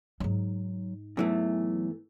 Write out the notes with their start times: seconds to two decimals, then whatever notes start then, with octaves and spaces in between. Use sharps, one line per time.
0.20 G#2 F#3 D#4
1.17 E2 E3 F#3 A3